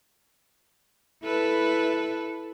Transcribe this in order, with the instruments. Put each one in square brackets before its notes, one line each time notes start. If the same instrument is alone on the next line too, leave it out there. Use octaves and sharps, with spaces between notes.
[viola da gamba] E4 A4 B4